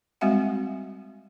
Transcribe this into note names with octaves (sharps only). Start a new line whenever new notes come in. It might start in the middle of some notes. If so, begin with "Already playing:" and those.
G3 G#3 C4 F#4 E5 F#5